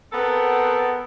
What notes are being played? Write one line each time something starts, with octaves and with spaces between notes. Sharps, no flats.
B3 C4 A4 A#4 F#5